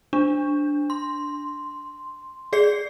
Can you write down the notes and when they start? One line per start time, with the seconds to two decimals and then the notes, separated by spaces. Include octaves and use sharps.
0.13 D4
0.90 C6
2.53 G#4 D5 C7